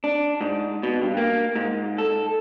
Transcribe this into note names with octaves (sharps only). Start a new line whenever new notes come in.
D4
G#2
B2
G2
A#3
G#2
A4